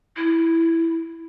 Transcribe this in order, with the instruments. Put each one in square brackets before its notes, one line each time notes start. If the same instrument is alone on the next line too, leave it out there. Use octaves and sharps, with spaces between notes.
[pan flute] E4